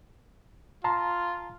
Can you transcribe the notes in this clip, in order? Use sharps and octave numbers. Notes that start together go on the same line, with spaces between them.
F4 A5 A#5 C6